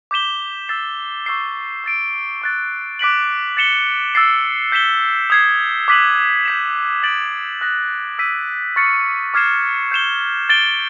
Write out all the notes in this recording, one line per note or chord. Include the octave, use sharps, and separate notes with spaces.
D6 G6 B6 E7 G7
E6 A6 C7
C#6 E6 G6 C7
E6 A6 D7
C#6 F#6 A6
D6 F#6 B6 D7 F#7
A6 C#7 E7 G7
E6 A6 C7
G6 B6 E7 G7
D#6 G#6 C7
D6 F#6 B6 D#7 F#7
G6 B6 E7
A6 D7 F#7
D#6 F#6 A#6
E6 G6 B6 D#7
C#6 F6 A6 C#7
D6 F6 G#6 C7 E7
G6 C7 E7 G7
A6 D7 G7